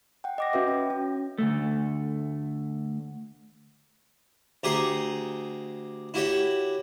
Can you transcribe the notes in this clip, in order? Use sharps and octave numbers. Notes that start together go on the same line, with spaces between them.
F#5 G5
D#5 D6 A#6
C#4 F#4 B4 E5
G5
C#4
D2 G#2 A3
D2 G4 G#4 A#5 C6 C#6
E4 F#4 G4 C#5